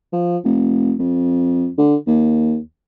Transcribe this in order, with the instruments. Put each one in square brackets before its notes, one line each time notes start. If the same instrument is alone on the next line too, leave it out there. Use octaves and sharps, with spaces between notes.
[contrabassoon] F3
F1
F2
D3
D#2